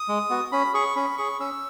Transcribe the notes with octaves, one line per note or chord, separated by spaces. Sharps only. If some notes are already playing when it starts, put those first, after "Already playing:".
Already playing: D#6
G#3
B3 F#4
C#4 B5
G#4 C#6
C#4 B5
G#4 C#6
C#4 E6